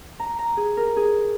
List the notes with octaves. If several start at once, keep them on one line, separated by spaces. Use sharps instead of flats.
A#5
A#5
G#4
A#4
G#4